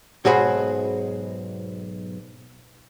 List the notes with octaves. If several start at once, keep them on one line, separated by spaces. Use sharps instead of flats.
B1 G#2 F#4 G#4 C5 B5